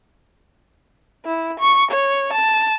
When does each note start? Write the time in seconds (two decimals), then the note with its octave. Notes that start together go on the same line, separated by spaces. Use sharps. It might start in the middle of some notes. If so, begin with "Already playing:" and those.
1.25 E4
1.59 C#6
1.90 C#5
2.33 A5